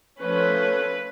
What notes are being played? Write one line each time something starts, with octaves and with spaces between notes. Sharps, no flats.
F3 A3 C#4 B4